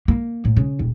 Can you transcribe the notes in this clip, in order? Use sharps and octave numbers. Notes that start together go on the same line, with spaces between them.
A#3
A2
C#3
D#1